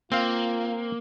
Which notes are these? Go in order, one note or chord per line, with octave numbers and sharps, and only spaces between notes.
A#3 C4 F4 F5